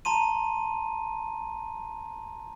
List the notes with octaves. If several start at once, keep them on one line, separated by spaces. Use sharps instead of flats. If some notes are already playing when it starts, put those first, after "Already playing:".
A5 A#5 C6 D#7